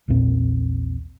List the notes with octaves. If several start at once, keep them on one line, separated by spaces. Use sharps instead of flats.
A#1 E2 A#2 C4